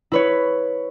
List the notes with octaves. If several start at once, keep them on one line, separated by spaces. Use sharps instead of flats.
E4 B4 C#5